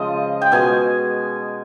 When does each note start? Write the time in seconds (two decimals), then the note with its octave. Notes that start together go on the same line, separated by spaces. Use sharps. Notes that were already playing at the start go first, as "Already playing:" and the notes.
Already playing: C#3 F3 G#3 D#5
0.42 G5
0.52 B2 G#3 G#5